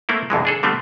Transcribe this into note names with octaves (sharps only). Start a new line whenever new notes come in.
A3 A#3 C4 E4
C2 F2 E3 G#3
D4 G#4 A4
D3 G3 A3 B3 C4